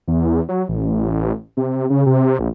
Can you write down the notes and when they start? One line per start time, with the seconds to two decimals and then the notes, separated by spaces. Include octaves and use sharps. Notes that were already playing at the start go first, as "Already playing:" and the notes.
0.08 E2
0.49 F#3
0.69 A1
1.57 C3
1.90 C#3
2.06 C3
2.39 A#1